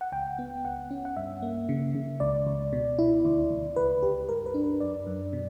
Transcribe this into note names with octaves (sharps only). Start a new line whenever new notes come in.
F#5
C#2 G5
B3
C#2 F#5
C#4
F#5
G2 E5
A#3
C#3
C#3
C#2 D5
C#2
B2
E4
D2
D2
C#2 B4
C#2 G4
G2 A#4
B4
D4
B4
F#2 D5
F#2
B2